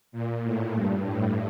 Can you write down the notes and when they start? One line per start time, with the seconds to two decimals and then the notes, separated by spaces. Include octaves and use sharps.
0.12 A#2
0.43 A2
0.73 G2
1.03 A2